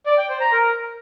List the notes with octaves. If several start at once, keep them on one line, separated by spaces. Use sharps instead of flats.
D5
G5
C5
A#5
A#4